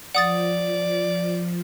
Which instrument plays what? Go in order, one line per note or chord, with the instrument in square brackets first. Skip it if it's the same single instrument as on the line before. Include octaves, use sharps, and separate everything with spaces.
[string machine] F3 [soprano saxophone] D5 [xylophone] F#5 D#6 A6